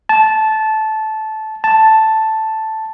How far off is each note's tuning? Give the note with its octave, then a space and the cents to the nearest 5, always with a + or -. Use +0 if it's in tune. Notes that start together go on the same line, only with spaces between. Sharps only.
A5 -15
A5 +0